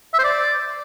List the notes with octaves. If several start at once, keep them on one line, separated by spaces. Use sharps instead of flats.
E5
C5
D5